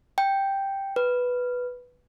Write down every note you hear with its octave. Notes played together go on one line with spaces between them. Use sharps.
G5
B4